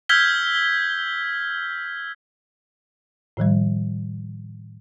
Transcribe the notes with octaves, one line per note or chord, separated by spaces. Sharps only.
E6 F6 G6 G#6 B6 G7
A2 D#3 F3 G3